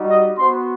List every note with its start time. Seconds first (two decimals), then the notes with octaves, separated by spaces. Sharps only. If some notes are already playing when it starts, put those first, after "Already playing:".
Already playing: G3 D#4 F#4
0.08 D#5 D#6
0.37 B3 F#4 C5 C6